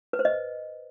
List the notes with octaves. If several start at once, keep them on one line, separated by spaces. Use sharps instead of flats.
B4
C5
D#5